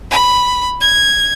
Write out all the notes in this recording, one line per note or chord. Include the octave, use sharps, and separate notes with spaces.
B5
G#6